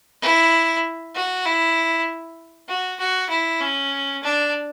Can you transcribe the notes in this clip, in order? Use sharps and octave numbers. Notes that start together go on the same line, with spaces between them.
E4
F#4
E4
F#4
F#4
E4
C#4
D4